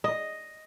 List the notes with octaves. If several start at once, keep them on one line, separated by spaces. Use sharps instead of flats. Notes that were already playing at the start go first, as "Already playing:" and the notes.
D#5